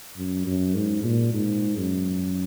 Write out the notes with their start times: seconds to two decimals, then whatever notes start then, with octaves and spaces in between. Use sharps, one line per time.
0.17 F#2
0.46 F#2
0.75 G#2
1.04 A#2
1.34 G#2
1.77 F#2